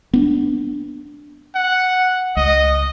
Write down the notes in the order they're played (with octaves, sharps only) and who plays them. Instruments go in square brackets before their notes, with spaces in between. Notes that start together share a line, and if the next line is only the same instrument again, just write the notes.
[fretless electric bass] B3 D4
[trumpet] F#5
[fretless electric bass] C#2 [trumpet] D#5